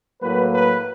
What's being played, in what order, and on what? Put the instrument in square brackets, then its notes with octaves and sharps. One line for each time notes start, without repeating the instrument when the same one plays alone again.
[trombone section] A2 F#3 A#3 B4
B4